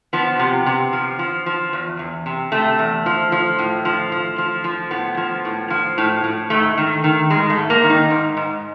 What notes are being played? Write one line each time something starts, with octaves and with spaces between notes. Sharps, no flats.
F3 B3
C3
C3
F3
F3
F3
E2
E2
C3
C3 A3
E2
F3
F3
A2
F3
F3
F3
F3
A2 B3
F3
A2
F3
A2
A2
G#2 A3
D#3
D#3
G#2 G#3
A3
G#2
A#3
D#3
D#4
G#2
G#2